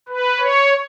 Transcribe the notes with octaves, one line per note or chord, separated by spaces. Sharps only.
B4
C#5